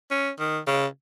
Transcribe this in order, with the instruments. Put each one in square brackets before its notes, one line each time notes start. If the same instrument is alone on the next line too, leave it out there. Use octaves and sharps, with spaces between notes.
[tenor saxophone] C#4
D#3
C#3